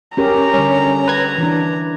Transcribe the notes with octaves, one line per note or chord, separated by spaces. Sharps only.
C#4 G4 A#4 A#5
D3 G3 C#4
B4 G#6
E3 D4